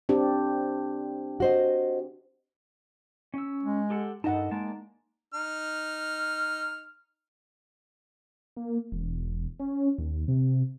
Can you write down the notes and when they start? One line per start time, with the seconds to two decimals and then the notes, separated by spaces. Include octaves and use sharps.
0.09 C4 D4 G4
1.40 F#4 C5 D#5
3.34 C#4 E6
3.63 G#3
3.90 G4 A4 F#5
4.24 G2 D#4 A4 D#5 F#5 A5
4.51 G#3 A#3 D5 A5
5.34 D#4 F6
8.57 A#3
8.92 E1
9.60 C#4
9.98 D#2
10.28 C3